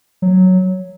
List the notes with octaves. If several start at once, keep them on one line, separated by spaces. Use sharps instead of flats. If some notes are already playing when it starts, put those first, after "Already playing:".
F#3